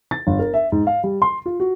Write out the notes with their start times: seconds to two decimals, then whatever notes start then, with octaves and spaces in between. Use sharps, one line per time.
0.11 A6
0.27 G1
0.39 A#4
0.54 E5
0.72 G#2
0.87 F5
1.03 G3
1.22 C6
1.46 F4
1.60 F#4